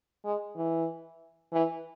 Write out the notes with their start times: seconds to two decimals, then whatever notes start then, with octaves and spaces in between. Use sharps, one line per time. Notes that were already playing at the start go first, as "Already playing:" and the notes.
0.24 G#3
0.56 E3
1.52 E3